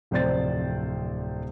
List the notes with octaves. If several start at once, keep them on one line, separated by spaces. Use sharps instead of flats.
D1 F2 C3 C5 D5 A6